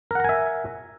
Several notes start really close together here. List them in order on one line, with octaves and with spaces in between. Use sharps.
A#4 F#5 A#5 G#5 E5